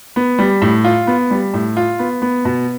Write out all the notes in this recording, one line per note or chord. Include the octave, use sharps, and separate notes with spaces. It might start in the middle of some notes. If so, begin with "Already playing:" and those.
B3
G3
A2
F4
B3
G3
A2
F4
B3
B3
B2